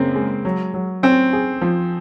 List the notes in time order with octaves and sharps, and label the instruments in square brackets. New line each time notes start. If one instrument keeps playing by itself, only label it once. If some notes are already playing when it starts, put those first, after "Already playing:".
Already playing: [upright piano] F#2 C#3 [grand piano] A#3 C4
[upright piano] G#3
F#3
F#3
[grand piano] C4 [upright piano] C#4
[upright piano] G#4
F3